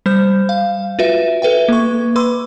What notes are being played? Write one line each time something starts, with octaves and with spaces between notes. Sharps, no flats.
G3 C5 G6
F5
F4 F#4 B4 E5
A4 B4 E5 G5
A#3 C#6
B4 B5 C6 D6 E6